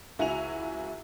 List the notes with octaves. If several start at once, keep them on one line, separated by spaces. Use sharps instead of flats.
C#2 E4 F#4 G#5 D#7 F7